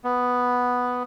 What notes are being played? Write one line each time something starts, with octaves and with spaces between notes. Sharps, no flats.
B3